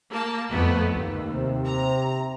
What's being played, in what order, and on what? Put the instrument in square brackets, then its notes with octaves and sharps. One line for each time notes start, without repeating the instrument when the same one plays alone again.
[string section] A#3 A5
F2 A3 B3
D#2
[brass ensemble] C3
[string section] A#5